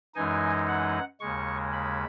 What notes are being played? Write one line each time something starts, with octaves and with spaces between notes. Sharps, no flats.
F#2 E3 G#3 D#4 G#5
F#5
D#2 C#3 G#3 C#6
B5